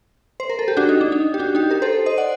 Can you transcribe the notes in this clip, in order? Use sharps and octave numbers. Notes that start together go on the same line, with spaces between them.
C5
A#4
A4
G4
D4 F#4
D#4
D4
D#4
G4
D4 F#4
D#4 G4
G4 A#4
A4 C5
C5 D#5
D5 F#5